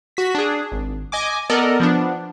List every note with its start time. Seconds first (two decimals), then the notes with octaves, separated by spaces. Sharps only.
0.17 F#4 B6
0.35 D4 G#4
0.72 G#1
1.12 D#5 G#5 D6
1.50 B3 A4 A#4 D5 D#5
1.80 F3 B3 D4